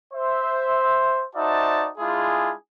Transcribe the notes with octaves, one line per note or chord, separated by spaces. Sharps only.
C5 E5
D#4 F#4 C5 D5 E5 A5
G#3 D4 E4 F4 G#4